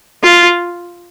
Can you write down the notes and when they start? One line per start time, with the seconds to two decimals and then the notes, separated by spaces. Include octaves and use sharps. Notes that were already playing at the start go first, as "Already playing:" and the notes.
0.23 F4